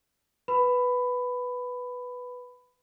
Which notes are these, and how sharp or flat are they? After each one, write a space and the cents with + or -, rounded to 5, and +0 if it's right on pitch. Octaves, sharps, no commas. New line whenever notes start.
B4 +0 B5 +15